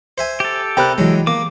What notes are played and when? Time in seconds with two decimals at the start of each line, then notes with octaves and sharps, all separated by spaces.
0.18 C5 E5 G#5
0.40 G4 A4
0.77 C3 A#4 D5 G5 B5 F#6
0.98 C2 E3 F#3 G#3
1.27 A#3 D6